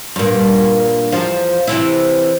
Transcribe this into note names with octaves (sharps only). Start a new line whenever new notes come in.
G2 A#2
E2 F3
C3 E3 E4